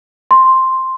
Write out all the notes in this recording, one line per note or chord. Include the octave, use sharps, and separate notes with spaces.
C6